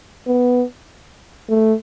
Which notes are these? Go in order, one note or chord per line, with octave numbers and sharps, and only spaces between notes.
B3
A3